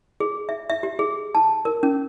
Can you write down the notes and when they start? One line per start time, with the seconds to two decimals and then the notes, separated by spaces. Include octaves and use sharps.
0.20 G#4
0.49 E5
0.70 E5
0.83 G4
0.99 G#4
1.35 A5
1.65 A#4
1.83 C#4